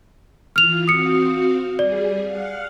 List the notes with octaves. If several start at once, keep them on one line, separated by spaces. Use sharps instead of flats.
E3 F4 F6 F7
C4 F#4 F5 D#6 C#7
G3 G#4 D5
F5 F#5 F6